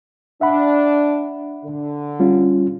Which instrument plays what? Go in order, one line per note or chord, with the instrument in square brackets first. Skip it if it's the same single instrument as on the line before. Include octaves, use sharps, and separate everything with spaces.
[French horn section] D4 [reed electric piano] E5 F#5 B5
[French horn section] D3
[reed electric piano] G3 C#4 F4